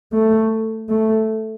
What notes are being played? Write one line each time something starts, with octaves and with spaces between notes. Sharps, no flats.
A3
A3